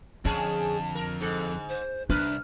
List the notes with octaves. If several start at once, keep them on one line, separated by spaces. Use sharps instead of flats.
F2 D3 C#4 G#4 A5
A#4
G#2 A4
C5
C2 D4 B4 F6